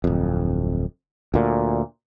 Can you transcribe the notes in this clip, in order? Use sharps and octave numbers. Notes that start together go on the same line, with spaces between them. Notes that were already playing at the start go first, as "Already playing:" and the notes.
D1 F2
D2 A#2